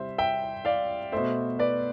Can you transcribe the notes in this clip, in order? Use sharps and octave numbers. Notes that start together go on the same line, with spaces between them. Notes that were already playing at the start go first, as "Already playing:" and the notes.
Already playing: C3 G3 C5 E5
E5 G5
D5 F5
B2 A3 C5 E5
B4 D5